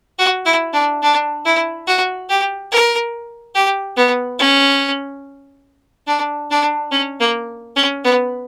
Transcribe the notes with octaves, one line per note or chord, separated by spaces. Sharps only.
F#4
E4
D4
D4
E4
F#4
G4
A#4
G4
B3
C#4
D4
D4
C#4
A#3
C#4
B3